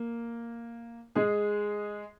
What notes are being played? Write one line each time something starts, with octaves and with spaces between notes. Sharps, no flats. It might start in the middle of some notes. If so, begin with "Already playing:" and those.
Already playing: A#3
G#3 G#4